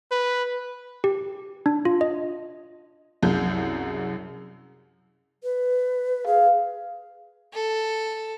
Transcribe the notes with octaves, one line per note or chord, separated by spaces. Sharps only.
B4
G4
D4
F4
D#5
C2 F#2 G#4 G6
B4
G#4 F5
A4